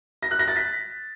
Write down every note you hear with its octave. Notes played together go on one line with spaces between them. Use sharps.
A#6
F#6
A#6
A6
B6